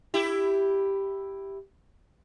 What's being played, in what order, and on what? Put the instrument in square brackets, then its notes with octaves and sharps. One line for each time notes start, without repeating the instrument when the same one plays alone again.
[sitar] E4 G4